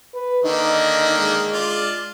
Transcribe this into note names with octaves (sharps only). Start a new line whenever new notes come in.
B4
D3 D#3 A#3 D#4
G#3
D4 F4